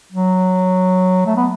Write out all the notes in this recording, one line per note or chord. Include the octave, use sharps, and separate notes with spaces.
F#3
A3
B3